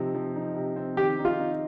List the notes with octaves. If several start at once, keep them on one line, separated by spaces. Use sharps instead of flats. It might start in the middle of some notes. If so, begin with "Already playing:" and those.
Already playing: C3 F3 C4 D#4
F3
D#4
C3
C4
D#3 G4
D#4
F4
D#4